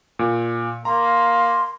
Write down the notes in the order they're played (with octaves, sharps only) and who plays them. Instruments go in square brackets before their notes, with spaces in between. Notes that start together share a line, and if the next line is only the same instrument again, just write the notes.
[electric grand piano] A#2
[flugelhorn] A#3 [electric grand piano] A#5 [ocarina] C6